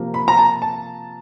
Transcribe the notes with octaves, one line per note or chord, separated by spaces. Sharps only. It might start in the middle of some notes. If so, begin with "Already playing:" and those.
Already playing: C3 F3 A#3
B5
A#5
A5
A5